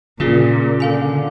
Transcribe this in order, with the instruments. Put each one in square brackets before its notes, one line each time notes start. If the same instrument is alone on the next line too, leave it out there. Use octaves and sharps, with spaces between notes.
[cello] A#2 [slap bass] C#3 [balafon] F4 G#4
[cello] D3 [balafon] A4 F5 G#5